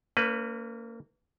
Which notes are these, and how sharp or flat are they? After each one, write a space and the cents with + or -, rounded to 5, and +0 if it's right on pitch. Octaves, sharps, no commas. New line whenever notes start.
A#3 -30 C#4 +30 B4 +10